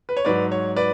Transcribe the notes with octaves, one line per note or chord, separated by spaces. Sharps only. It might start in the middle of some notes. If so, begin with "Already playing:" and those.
B4
C#5
G#2 F#3 B4 D5
C#5
B4 D5